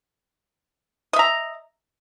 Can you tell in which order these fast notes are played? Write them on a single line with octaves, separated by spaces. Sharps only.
D#5 E5 A#5